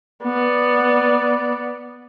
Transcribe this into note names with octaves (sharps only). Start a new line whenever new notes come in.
B3 D5